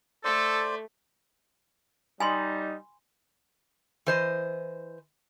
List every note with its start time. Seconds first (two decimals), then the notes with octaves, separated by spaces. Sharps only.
0.24 A3 A4 C5 D5
2.20 G3 D#4 G#5 B5 C6
4.06 E3 C5 D#5